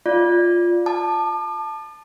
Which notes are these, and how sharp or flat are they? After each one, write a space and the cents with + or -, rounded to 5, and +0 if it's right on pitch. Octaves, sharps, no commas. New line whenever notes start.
F4 +0 D5 +0
A5 +0 D6 +40